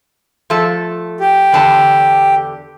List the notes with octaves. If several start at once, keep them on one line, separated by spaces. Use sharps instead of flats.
F3 A3 A4
G4
E2 D3 A5